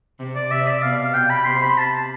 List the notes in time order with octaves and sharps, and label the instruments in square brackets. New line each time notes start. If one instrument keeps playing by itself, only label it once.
[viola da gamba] C3
[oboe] D5
[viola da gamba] C3 [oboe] E5
[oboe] D5
[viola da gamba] B2 [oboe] F5
[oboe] F5
[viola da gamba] B2 [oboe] G5
[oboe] B5
[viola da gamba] C3 [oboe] C6
[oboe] B5
A5